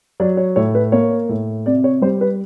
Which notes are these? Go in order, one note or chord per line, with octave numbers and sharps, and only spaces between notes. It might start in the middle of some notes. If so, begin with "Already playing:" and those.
F#3 D5
C#5
A2 C#5
B4
A#3 C#5
A2
C3 D5
C#5
G3 C5
B4